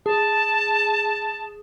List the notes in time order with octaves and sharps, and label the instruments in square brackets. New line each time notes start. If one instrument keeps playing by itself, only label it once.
[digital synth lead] G#4 [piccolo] A5